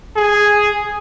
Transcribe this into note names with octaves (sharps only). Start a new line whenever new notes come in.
G#4